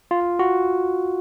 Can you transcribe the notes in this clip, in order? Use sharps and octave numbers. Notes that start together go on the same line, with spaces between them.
F4
F#4